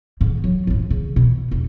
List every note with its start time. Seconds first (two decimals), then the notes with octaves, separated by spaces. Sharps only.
0.21 B1 G#2
0.44 F#3
0.67 A1 F#2
0.90 C#3
1.16 B2
1.51 E1 D#4